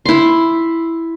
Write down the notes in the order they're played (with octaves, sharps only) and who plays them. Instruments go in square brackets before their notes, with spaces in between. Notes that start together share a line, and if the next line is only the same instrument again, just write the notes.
[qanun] E4 C6